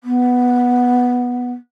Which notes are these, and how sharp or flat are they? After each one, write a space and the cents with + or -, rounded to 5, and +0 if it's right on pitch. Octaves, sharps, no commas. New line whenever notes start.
B3 -5